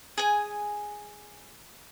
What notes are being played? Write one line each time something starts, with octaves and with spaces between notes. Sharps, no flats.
G#4 G#5